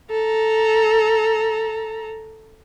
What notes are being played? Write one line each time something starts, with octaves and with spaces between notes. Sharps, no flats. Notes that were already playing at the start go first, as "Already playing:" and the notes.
A4 A#5